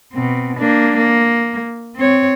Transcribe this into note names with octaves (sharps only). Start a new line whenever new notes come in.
B2 C4
A#3 D4
A#3
C4 C#5